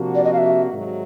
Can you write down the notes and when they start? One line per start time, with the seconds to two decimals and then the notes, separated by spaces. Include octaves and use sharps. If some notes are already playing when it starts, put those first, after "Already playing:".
Already playing: C3 F3 A#3 D4 F#4
0.15 D5
0.24 D#5
0.33 F5
0.38 E5
0.73 G#2 D#3 F#3